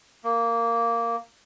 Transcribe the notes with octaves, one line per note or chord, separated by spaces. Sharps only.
A#3